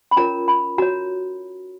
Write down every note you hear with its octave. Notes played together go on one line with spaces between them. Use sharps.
B5
C#4 F4 A#4 C#5 A#5
B5
F#4 C#5 A#5